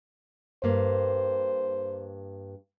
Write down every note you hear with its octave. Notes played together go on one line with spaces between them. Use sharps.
G2 A#3 C5